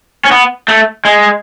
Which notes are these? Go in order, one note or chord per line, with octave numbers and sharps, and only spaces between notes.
C#4
B3
A3
G#3